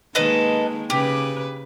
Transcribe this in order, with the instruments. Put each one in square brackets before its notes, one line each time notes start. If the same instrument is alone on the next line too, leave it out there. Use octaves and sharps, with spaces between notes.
[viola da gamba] D#3 G#3 A#3 [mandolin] A4 B4 D#5
[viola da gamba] C#3 B4 [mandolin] G4